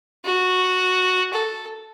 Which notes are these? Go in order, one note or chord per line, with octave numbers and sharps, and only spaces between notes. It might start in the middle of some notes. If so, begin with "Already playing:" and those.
F#4
A4